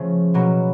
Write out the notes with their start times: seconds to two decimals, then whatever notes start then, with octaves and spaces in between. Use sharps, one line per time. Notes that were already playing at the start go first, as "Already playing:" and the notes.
Already playing: C#3 F3 A3
0.34 B2 F#3 A#3